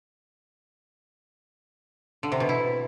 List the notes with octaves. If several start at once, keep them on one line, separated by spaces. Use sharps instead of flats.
D3
C3
B2
E4